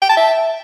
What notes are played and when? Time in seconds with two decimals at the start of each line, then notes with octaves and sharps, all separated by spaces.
0.02 G5
0.10 A5
0.17 E5